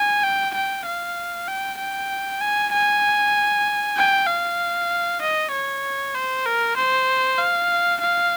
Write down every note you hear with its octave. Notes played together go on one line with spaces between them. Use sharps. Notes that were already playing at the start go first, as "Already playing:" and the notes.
Already playing: G#5
G5
G5
F5
G5
G5
G#5
G#5
G5
F5
D#5
C#5
C5
A#4
C5
F5
F5